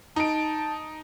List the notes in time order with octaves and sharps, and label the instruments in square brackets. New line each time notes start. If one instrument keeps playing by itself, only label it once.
[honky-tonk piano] D#4 D7 [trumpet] A5